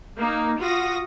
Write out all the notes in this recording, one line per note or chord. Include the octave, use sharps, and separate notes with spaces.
A#3 D#4
F4 F#4 D#6 A#6